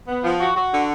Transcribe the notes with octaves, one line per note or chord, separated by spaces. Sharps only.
B3
F3
F#4
F#4
D3